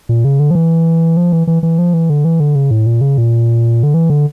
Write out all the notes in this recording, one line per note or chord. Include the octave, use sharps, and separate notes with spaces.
A#2
C#3
D3
F3
E3
F3
E3
E3
E3
F3
E3
D3
E3
D3
C#3
A2
A#2
C#3
A#2
D3
E3
D3